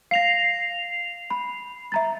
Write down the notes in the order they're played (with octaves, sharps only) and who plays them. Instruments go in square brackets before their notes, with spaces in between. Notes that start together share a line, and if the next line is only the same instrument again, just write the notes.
[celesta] F5 A#6 [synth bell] C7 F7
[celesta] B5
E5 A#5 A6